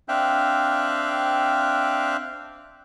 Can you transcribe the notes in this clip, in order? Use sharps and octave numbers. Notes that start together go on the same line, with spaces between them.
C4 D4 E5 F5 G5 F#6